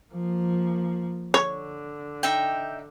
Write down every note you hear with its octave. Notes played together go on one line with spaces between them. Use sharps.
F3 A#3
D3 C#5
D#4 E5 G5